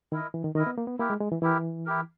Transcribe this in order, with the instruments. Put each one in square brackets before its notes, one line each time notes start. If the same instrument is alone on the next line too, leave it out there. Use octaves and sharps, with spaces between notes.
[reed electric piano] D#3 [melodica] E4 A#4 D#5
[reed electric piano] E3
D#3
[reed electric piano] D#3 [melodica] E4 A#4 D#5
[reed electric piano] B3
A#3
B3
[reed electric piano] A#3 [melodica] E4 G4 A#4
[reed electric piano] G#3
G#3
E3
[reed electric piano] E3 [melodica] E4 G4 A#4
[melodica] E4 G4 A#4